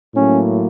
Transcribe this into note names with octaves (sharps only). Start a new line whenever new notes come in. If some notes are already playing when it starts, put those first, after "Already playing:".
A2 F#3 A#3 C#4